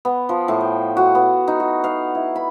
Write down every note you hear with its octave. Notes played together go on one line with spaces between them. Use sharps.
B3
F3
A2
G5
F#4
B3
D#4
F#4
F5
E4
B5